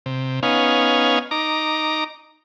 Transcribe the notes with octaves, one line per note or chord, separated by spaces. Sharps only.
C3
B3 C#4 D#4 F5 G#5
D#4 A#5 D6